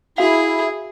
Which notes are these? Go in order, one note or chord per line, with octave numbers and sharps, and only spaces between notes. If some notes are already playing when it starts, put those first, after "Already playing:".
E4 F#4 G#4 F5